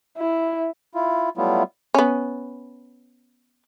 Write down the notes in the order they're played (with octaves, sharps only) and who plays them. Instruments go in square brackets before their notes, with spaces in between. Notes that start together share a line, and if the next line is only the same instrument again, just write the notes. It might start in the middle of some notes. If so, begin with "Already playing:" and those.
[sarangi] E4
[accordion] E4 F4
F#3 G3 A3 B3 E4 F4
[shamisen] B3 C#4